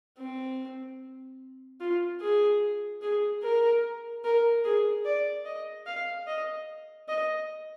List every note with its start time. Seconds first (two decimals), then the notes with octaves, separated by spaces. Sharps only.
0.18 C4
1.80 F4
2.21 G#4
3.02 G#4
3.43 A#4
4.24 A#4
4.65 G#4
5.05 D5
5.46 D#5
5.86 F5
6.27 D#5
7.08 D#5